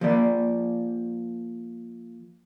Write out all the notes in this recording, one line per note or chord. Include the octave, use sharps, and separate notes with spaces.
F3 A#3 D5